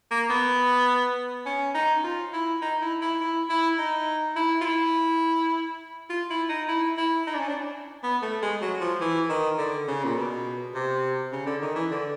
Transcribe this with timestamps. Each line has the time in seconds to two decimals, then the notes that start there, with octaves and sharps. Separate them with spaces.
0.11 A#3
0.30 B3
1.46 C#4
1.75 D#4
2.04 F4
2.33 E4
2.62 D#4
2.82 E4
3.02 E4
3.21 E4
3.50 E4
3.78 D#4
4.36 E4
4.61 F4
4.65 E4
6.10 F4
6.30 E4
6.49 D#4
6.68 E4
6.97 E4
7.27 D#4
7.34 D4
7.40 C#4
7.48 D4
8.03 B3
8.22 A3
8.43 G#3
8.62 F#3
8.81 F3
9.01 E3
9.30 D#3
9.58 D3
9.88 C#3
10.04 A#2
10.16 B2
10.75 C3
11.32 C#3
11.46 D3
11.62 D#3
11.75 E3
11.91 D3